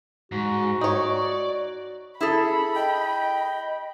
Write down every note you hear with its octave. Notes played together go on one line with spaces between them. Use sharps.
G#2 F#4
D#4 C#5 D5
E4 G#4 A4 B5
D#5 G5